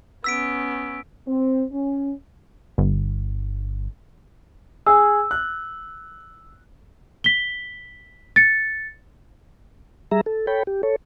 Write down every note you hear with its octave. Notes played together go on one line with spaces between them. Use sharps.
B3 C#4 E6 B6 D7
C4
C#4
G1
G#4 G#5 E6
F#6
B6 G7
A6 C#7
G3 G#4 E5 A#5
A4
A4 C#5 G5 B5
G4
A4 C#5